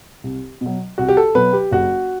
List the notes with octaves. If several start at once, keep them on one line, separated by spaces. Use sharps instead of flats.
C2
B2 F#3
C2 F#4
G4
A4
B2 F#3 B4
G4
F#1 F#4